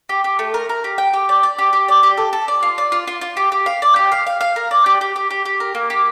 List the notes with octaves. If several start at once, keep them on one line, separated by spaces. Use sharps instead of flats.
G4
G4
A3
A#4
A#4
G4
G5
G4
D5
D5
G4
G4
D5
G4
A4
A4
D5
F4
D5
F4
F4
F4
G4
G4
F5
D5
G4
F5
F5
F5
A#4
D5
G4
G4
G4
G4
G4
A#4
A#3
G4